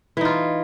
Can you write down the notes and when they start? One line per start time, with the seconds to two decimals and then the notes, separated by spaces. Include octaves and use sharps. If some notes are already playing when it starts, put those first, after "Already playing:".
0.17 E3
0.21 D#4
0.25 F4